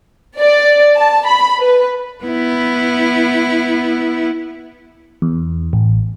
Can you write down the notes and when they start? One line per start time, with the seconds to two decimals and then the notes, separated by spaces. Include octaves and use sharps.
0.39 D5
0.97 A5
1.27 B5
1.59 B4
2.24 B3 E4
5.22 E2
5.73 A1